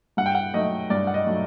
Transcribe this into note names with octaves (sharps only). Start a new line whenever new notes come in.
G2 F#5
G5
F#5
F#3 A3 D#4 D#5
G2 D5
F#5
D#5
F#3 A3 D#4